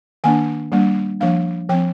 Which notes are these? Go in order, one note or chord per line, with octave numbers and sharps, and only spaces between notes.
D#3 A#3 D4 G#5
G3 A#3 D4
F3 A#3 D4 F5
F3 C4 G5